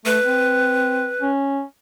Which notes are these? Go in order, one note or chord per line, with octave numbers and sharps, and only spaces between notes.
A3 B4
C4
C#4